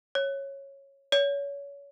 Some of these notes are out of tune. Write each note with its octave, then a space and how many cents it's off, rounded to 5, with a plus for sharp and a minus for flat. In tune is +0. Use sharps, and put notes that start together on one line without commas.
C#5 -10
C#5 +30